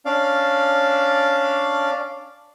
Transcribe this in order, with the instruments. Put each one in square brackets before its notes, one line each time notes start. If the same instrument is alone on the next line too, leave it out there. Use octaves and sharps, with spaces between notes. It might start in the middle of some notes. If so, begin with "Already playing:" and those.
[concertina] C#4 D4 D5 F5